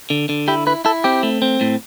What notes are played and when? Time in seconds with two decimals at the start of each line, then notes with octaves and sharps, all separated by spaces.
0.10 D3
0.29 D3
0.48 E4 G4
0.67 E4 B4
0.85 E4 A4
1.04 C4 G4
1.23 A3
1.42 C4
1.61 A2